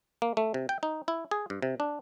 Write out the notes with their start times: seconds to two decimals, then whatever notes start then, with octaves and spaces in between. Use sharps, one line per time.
0.22 A#3
0.37 A3
0.54 C3
0.69 G5
0.83 D#4
1.08 E4
1.31 G#4
1.50 G2
1.62 C3
1.80 D4